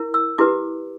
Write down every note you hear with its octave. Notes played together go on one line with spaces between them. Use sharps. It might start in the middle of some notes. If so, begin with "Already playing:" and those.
Already playing: E4 A#4
E6
E4 G4 B4 D6